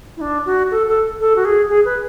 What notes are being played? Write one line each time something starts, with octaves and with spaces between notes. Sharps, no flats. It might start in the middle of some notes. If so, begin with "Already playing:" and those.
E4
D4
F#4
A4
A4
A4
F#4
G#4
G#4
B4